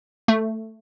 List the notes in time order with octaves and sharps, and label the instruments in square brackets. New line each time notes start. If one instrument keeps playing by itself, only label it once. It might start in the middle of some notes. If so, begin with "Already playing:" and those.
[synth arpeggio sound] A3